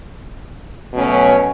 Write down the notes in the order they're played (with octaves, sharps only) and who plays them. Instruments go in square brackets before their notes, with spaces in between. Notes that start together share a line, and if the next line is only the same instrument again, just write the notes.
[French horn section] B2 F#3 A3 C#4